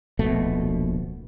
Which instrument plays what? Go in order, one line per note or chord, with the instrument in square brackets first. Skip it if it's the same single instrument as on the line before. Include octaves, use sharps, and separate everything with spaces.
[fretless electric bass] D1 A#1 B2 A3